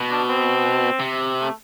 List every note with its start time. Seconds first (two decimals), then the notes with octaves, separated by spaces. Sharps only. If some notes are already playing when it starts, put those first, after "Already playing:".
Already playing: B2
0.11 D4
0.29 C4
1.00 C3
1.41 A3